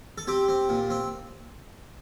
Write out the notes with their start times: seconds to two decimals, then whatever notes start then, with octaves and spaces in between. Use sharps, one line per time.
0.18 A4
0.27 C4 G4
0.48 C4
0.69 A#2
0.90 C4